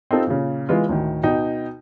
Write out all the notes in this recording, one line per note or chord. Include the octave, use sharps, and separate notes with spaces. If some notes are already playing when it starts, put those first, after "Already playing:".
C4 D#4 F4 A4
A#2 C#3
E3 G#3 B3 F4
D2 A2 D#3
B2 D#4 G5